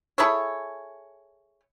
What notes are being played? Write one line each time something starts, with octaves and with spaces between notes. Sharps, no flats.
E4 G#4 A4 C#5